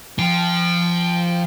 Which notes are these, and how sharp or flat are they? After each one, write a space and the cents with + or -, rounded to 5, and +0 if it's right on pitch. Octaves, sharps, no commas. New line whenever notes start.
F3 -10 G5 +10